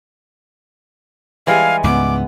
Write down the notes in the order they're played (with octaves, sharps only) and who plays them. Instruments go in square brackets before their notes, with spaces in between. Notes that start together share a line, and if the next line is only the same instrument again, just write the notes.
[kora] E3 G3 G#3 [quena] F5 [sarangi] G#5
[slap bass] C#2 G#2 [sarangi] B3 [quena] D6